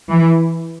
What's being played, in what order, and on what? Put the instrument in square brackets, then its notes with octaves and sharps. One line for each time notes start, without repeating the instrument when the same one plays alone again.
[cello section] E3